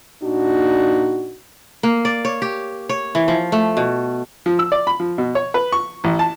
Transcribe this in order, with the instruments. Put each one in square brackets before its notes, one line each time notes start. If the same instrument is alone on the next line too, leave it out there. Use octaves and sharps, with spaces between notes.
[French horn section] A#2 D4 D#4 F#4
[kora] A#3
D5
C#5
G4
C#5
E3
F3
A3
B2
[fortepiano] F3
E6
D5
B5
F3
B2
C#5
B4
C#6
A1
A5